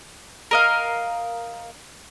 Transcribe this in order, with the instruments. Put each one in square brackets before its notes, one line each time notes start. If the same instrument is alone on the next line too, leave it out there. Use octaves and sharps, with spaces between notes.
[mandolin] A#4 D#5 F5